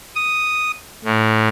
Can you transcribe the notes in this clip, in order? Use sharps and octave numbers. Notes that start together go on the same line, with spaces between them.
D#6
A2